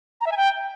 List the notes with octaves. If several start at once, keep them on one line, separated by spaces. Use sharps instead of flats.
A#5
E5
G#5
G5